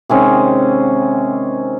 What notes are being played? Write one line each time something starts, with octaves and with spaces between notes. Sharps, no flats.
C3 D#3 G#3 C#4